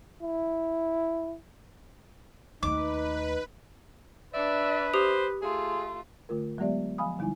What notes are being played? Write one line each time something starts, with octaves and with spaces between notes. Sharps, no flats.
E4
D#2 A3 D#4 B4 D6
D4 B4 D5 E5
G4 C5 D#6
A3 F4 G#4
D3 A3 F4 A#4
F#3 G#3 B3 G4 D5 E5
F3 F5 G#5 B5 D#6
D3 G3 D#4 E4 G#5